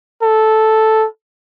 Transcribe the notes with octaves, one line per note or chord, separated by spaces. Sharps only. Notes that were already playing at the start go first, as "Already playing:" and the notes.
A4